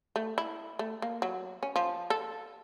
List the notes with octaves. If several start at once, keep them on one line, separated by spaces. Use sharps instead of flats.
A3
E4
A3
A#3
F#3
C#4
F3
A4